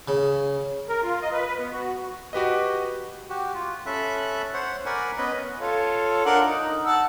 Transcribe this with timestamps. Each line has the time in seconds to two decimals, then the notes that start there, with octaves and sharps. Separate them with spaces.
0.08 C#3
0.89 A#4
1.02 F4
1.21 D#5
1.32 B4
1.59 B3
1.72 F#4
2.33 F#4 G4 B4 D#5
3.30 F#4 G4
3.54 F4
3.86 C#4 A4 E5 B5 F#6
4.54 C5 C#5 F#5
4.86 A#4 D5 F#5 G#5 B5
5.18 B3 C#4 B4 D#5 B5
5.60 F4 A4 C#5
6.26 D4 A#4 F#5
6.46 D#4
6.85 F#5 A5 E6